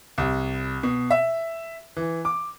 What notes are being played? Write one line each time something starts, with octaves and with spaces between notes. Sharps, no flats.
C2
B2
E5
E3
D6